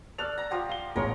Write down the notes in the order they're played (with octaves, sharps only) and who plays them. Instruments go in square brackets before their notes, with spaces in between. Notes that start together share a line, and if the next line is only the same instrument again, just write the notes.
[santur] A4 D5 A5 [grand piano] F6 F#6 F7
[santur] A#5
F3 G4 F#5
[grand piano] F5 G7
[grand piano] E1 A1 C#5 [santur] G#3 A#4